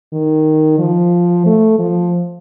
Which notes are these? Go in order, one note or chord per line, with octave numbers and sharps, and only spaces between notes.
D#3
F3
A3
F3